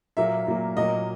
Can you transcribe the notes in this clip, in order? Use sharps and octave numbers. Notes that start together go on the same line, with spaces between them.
A#2 F#3 A#3 E5
A#2 F#3 A#3
A#2 F#3 A#3 D#5